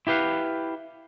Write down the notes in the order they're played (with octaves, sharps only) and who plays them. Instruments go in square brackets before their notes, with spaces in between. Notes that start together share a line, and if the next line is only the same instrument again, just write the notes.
[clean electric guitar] E4 G4 B4 F5 F#5